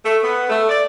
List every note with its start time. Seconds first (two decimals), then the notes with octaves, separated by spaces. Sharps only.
0.04 A3
0.23 B3
0.49 A3
0.69 D5